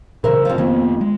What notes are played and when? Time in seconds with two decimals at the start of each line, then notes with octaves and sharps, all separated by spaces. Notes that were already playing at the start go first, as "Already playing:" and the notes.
0.24 A#2 C#3 E3 A#4 C5 E5
0.45 F2 F3
0.58 F2 D#3 A#3 B3
1.01 G#3